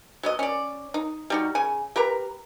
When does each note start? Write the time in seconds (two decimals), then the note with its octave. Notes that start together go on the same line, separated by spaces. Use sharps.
0.23 F#3 B3 D#5
0.39 C#4 D5
0.94 D#4
1.30 G3 D#4 F#4
1.55 C#3 G#5
1.96 G4 A#4 B4 A#5